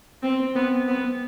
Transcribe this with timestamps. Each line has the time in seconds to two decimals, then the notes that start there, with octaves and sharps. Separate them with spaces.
0.23 B3 C4
0.40 C4
0.55 B3 C4
0.88 B3 C4
1.04 B3